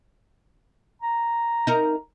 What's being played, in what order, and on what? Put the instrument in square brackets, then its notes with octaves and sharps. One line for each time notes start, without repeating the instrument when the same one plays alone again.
[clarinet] A#5
[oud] D#4 A#4